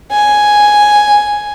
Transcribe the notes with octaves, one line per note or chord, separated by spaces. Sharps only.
G#5